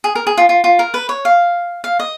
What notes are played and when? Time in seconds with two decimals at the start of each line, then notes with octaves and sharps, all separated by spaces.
0.04 G#4
0.15 A#4
0.27 G#4
0.37 F4
0.49 F4
0.64 F4
0.79 A#4
0.94 B4
1.09 C#5
1.25 F5
1.84 F5
2.00 D#5